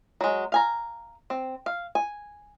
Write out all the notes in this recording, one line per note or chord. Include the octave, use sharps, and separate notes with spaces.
F#3 G#3
F5 G#5 A#5
C4
F5
G#5